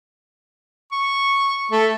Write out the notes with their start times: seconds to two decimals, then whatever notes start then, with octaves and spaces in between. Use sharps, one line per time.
0.92 C#6
1.72 A3